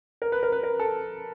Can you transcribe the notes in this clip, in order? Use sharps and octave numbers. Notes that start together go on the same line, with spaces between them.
A#4
B4
A#4
B4
A#4
A4